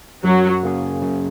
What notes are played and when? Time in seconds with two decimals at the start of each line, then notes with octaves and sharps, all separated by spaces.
0.24 F#2 F#3
0.63 C#3 A#3 C#4 G#4
1.02 F#2